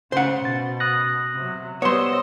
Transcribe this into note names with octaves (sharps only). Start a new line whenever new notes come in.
C#3 C5 F#5
B2 A6
D#6 F#6 A#6
C3 F#3
G3 B3 C5 C#5 D#5 C6 E6